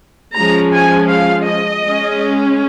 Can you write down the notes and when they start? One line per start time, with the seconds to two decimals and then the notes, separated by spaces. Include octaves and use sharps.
0.36 F3 G#3 C#4 A#5
0.73 G#5
1.10 F5
1.47 D#5
1.83 G#3 C#4